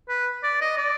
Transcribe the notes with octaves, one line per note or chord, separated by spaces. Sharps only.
B4
D5
D#5
D5